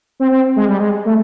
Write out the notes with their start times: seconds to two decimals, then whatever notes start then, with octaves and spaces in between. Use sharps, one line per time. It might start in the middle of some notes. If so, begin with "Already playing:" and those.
0.20 C4
0.31 C4
0.56 G#3
0.68 G3
0.80 G#3
1.05 A3